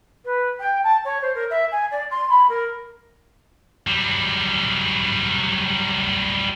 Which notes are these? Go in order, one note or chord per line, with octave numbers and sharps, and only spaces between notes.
B4
G5
A5
C#5
C5
A#4
E5
G#5
D5
C6
B5
A#4
F#3 G3